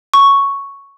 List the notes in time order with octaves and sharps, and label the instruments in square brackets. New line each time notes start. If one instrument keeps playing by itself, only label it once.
[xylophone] C#6